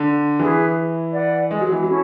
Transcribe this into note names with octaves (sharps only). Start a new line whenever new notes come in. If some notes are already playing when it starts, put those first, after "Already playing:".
Already playing: D3
E3 E4 G#4 B4
B4 D5 F#5
G#3
F#3
E3
F#3 C#4 E4 A4